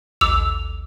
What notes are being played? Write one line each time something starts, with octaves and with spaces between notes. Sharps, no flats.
A1 D#2 D6 E6 F7